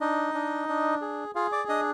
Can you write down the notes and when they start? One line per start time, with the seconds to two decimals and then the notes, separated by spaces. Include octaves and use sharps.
0.01 D4 D#4 D#5
0.34 D4
0.69 D4
1.02 G#4
1.35 F4 G#4 F5
1.52 D5 D6
1.69 D4 D#5 D#6